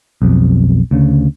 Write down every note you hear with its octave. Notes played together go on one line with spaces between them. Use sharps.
B1 F2
D2 C#3